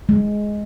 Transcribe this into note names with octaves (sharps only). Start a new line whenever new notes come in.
G#3